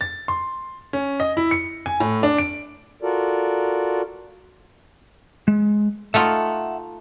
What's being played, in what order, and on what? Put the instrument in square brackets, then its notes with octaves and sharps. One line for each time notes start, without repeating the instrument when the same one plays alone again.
[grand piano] A6
C6
C#4
D#5
E4
C#7
G#5
A2
D4
D7
[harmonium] F4 F#4 A4 A#4 D5
[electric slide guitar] G#3
[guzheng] A3 D#4 F4 [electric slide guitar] E5 F#5